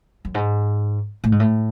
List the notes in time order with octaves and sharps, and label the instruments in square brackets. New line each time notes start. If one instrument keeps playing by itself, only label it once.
[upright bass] F#2
G#2
A2
G#2
A2